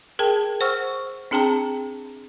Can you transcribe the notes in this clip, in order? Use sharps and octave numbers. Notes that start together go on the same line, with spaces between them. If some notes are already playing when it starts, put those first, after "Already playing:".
G#4 A#4 G5 A5
C5 F#5 C#6 E6 F6
C4 D4 G#4 G5 A5 A#5